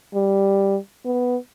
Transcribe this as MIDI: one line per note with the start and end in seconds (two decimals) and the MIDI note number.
0.15 0.77 55
1.05 1.37 59